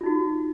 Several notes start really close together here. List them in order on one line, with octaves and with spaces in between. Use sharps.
F4 D#4 F#4